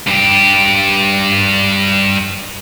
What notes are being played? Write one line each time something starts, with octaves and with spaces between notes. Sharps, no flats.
G2 G4